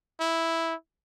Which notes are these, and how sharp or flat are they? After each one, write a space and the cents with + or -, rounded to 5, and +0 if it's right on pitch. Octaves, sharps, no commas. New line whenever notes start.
E4 -5